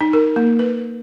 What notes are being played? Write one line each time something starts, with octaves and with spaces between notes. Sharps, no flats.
D#4
A#4
A#3
B4